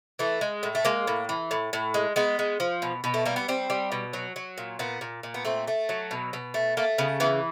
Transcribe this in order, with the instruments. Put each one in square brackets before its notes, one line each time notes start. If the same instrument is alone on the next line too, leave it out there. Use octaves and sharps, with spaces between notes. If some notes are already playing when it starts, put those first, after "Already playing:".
[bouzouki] E3 A3
G#3
A2
A3
G#3 A#3
A2
E3
A2
A2
G#3
G#3 B3
G#3
F3
B2
B2
A3
G3 A#3
B3
G3 C4
G3
B2
F#3
F#3
A#2
A#2 B3
A#2
A#2
B3
A3 C4
A3
F#3
B2
B2
A3
A3 A#3
C#3 B3
E3 B3